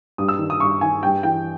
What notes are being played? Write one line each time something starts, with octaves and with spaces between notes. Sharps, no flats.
G2 D#6
E6
D#3
D#6
G2 C#6
D#3 G#5
G2 G5
E3 G5